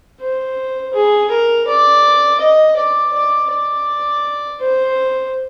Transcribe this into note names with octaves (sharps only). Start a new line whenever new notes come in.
C5
G#4
A#4
D5
D#5
D5
D5
D5
C5